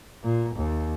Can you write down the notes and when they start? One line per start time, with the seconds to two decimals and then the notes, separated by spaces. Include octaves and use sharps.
0.23 A#2
0.56 D#2